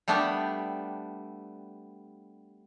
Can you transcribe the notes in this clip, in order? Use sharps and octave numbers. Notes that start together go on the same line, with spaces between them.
G3 A3 B3 D4 G4